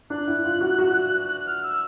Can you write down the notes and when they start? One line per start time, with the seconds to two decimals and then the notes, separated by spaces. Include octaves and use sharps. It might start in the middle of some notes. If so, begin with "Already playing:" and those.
0.10 D4 F#6
0.28 E4
0.44 F4
0.61 F#4
0.78 F#4
1.46 F6
1.63 E6